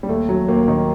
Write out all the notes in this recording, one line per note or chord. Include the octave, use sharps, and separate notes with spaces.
G3
D#2 A3
F#3
D#2 A#3
D#3